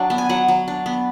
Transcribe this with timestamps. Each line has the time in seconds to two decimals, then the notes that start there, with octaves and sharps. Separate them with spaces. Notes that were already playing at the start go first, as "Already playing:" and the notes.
Already playing: F#3 D4
0.10 B3
0.18 G#5
0.29 F#3 F#5
0.48 F#3
0.68 D4
0.86 B3